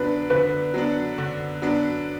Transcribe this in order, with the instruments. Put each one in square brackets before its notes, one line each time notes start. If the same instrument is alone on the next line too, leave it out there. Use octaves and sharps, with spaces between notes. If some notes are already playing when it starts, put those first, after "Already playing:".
Already playing: [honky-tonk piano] D3 F#3 B3 D4 [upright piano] B4
[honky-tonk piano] D3 [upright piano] B4
[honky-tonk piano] F#3 B3 D4
D3
F#3 B3 D4